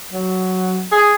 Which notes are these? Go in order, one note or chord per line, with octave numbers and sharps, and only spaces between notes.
F#3
G#4